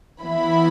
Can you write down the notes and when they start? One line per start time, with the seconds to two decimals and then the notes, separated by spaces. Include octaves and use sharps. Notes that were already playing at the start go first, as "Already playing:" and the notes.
0.22 E3 B3 E4 B5